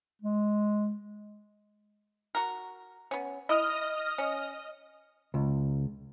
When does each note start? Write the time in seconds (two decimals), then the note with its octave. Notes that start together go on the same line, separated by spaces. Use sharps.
0.22 G#3
2.35 F#4 A#4
3.11 B3 C#4
3.49 E4 D#5 D#6 F6
4.18 C#4
5.34 C#2